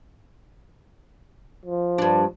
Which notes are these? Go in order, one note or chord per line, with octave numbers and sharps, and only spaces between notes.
F3
G2 D4